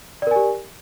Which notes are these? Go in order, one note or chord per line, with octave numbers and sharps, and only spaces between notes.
G4 A#4 D5 G#5